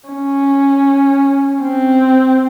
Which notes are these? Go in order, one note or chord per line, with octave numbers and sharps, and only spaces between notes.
C#4
C4